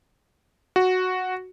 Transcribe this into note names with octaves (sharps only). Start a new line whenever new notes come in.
F#4